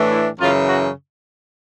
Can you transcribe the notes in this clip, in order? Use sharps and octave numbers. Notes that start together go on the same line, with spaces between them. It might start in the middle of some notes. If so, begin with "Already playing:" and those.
Already playing: A2 E3 A3 D4
E4
F#2 C#3 E3 F4
F#4